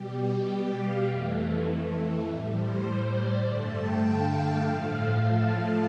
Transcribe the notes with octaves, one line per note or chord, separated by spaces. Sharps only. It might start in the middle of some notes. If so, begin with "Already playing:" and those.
Already playing: B2 G3 G4
G4
G4
F5
F2 E3 A3
A2 G3
C5
D5
G2 D3 A3 A5
G5
F5
F5
A2 F3 A3
F5
A5
F5